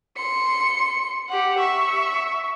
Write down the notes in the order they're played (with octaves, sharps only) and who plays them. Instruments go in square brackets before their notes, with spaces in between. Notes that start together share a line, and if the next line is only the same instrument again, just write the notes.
[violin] C6 C#7
G4 F#5
E5 C#6